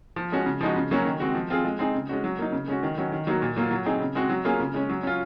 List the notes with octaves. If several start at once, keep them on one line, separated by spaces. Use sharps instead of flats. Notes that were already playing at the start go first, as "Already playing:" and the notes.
F3
G#3 C#4 F#4
C#3
F3 G#3 D#4 F#4
C#3
F#3 A#3 C#4 F#4
D#3
G#3 C4 F#4
F3
C4 F4 G#4
G#3
C4 D#4 G#4
C#3
G#3 C#4 F#4
F#3
A#3 D#4
C#3
G#3 C#4 F#4
D#3
F#3 C#4 F#4
D#3
F#3 A#3 D#4 F#4
A#2
F#3 A#3 F4
F#3
C4 D#4 G#4
C#3
G#3 C4 F#4
F#3
A#3 C#4 F4 G#4
C#3
G#3 C#4
F#3
C#4 F4